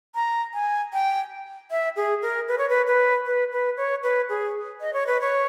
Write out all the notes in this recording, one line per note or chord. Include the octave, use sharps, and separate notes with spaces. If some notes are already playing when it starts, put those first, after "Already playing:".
A#5
G#5
G5
E5
G#4
A#4
B4
C#5
B4
B4
B4
B4
C#5
B4
G#4
D#5
C#5
B4
C#5